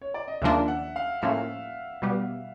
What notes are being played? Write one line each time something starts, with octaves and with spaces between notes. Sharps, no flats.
C#5
D5
D#5
D#2 C#3 F3 A#3 D4 E5
F#5
F5
A2 F3 A#3 C#4 E5
B2 G3 B3